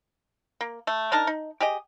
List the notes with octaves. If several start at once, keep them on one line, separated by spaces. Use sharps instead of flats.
A#3
A3
D4 D#4 A#4 A5
D#4
G4 G#4 D#5